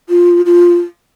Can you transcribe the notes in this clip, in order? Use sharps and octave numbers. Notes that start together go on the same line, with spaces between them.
F4
F4